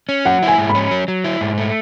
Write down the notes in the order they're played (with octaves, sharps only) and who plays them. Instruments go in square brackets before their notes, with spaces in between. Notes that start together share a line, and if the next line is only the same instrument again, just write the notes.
[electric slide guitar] C#4
[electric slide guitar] F#3 [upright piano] F#5
[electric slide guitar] E4
[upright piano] G#5
[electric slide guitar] G#2
[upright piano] B5
[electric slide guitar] C#4
F#3
F#3
E4
G#2
A3